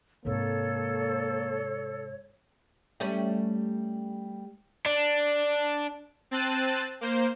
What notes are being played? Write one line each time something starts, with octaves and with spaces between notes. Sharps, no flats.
G#2 C3 A#3 A4 C#5
G3 A3 C#4
D4
C4 A5 F#6 A6 D#7
A#3 C5